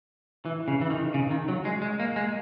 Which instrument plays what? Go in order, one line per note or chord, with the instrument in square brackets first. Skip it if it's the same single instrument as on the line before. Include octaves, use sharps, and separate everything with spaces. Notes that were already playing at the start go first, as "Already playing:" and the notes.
[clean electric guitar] E3
C#3
E3
D#3
C#3
D#3
F#3
G#3
G#3
A#3
G#3